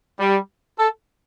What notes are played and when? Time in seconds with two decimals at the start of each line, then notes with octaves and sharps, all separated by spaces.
0.19 G3
0.78 A4